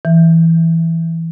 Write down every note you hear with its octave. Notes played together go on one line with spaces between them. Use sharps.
E3